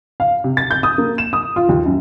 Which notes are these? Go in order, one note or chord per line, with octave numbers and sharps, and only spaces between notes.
F5
C3
A6
G6
D#6
A#3
E7
D#6
F4
D#2
F#2